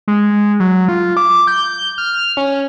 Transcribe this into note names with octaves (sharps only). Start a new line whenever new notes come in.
G#3
F#3
F4
D6
G6
F6
C#4